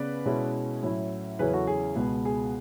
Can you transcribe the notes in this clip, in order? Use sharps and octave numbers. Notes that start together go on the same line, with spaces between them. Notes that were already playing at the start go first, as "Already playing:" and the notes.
Already playing: C#3 B3 B4 D5
B2 G#3 C#4 E4
A2 F#3 C#4 E4
E2 C#3 F#3 C#4 E4 G#4 B4
F#4 A4
G#4
C#2 B2 G#3 B3
G#4